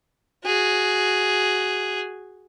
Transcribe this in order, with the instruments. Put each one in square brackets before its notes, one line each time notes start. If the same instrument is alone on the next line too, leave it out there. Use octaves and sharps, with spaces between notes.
[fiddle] F#4 G#4